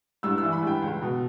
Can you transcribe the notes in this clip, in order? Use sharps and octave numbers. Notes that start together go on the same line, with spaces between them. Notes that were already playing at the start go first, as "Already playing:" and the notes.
G2 E6
E6
E3
B5
G2 G5
C#2
B2